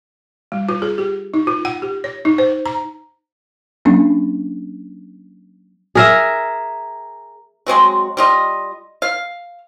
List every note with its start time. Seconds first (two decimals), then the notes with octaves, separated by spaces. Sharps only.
0.52 G3
0.69 F4
0.82 G#4
0.98 G4
1.34 D#4
1.47 F4
1.65 F#5
1.82 G4
2.04 C#5
2.25 D#4
2.38 C5
2.66 A#5
3.85 F#3 A#3 C#4 D4
5.95 G#4 A#4 E5
7.66 F#3 G#3 C4 F#4
8.17 G3 F4 D#5
9.02 F5